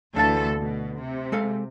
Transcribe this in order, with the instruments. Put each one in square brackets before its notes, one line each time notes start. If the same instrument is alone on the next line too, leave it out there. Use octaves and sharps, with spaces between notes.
[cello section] D2 E3 A4 [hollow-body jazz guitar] D3 F5 A5
[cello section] B2
C3
[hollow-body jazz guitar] G#3 A4 F5